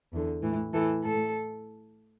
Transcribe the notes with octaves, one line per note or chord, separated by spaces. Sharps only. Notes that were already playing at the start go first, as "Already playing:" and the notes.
E2 D3
A2 E3
A2 E3 A4
A2 A4